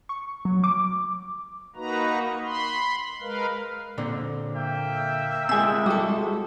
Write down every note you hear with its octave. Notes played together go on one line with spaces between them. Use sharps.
C#6
F#3
D6
A#3 D#4 F#4 B4 A#5
B5 C6
G#3 A#4 B4 F5
A#2 D3 C4
A#3 E5 G5
C3 G#3 G#5 E6
G3 F#4 A4